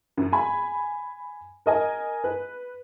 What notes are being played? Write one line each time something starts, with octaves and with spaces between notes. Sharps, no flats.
F#2
G#5 B5
A#4 D#5 G#5
B4